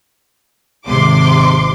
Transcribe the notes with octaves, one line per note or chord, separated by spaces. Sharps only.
G#1 C3 C6 D6